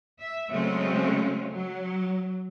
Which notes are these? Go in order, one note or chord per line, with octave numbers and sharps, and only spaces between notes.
E5
C#3 F#3 G#3 A3 C4 C#4
F#3